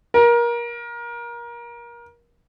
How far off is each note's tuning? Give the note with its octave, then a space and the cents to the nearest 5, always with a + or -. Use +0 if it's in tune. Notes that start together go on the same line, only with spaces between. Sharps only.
A#4 +25